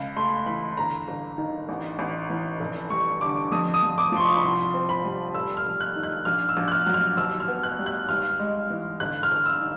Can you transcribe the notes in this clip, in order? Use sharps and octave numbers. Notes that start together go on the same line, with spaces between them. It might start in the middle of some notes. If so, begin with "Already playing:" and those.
Already playing: C#2
A3 C6
E3 B5
G1 A#5
G1
D#3
A1
A1
E3
F1
G3 C#6
D3 D6
F2 D#6
D#6
F2
D6
F3 C6
C#6
B5
C2 C6
C4
B5
G3
F1 E6
F6
F1
F#6
D#3
F#6
A#1 F6
E6
A#1
F#6
F6
F#3
F6
D#2 E6
F6
B3
F#6
G3
F#6
G#1 F6
G#3
E3
G1 F#6
F6
G1
E6
D#3